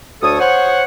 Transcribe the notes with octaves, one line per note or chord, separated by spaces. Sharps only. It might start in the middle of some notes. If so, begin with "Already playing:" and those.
D2 A4 C#5 A5 D#6
C5 C#5 F#5